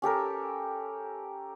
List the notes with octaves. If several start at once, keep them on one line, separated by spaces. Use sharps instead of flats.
C#4 G4 A4 A#4